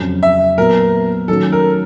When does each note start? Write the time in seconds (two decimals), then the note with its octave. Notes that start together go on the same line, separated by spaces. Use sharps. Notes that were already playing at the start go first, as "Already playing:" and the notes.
Already playing: F2 C#3 F#3
0.23 E5
0.57 A#2 F#3 B3 A#4
1.28 D#3 F#3 A3 C#4 F#4 A4
1.52 A#4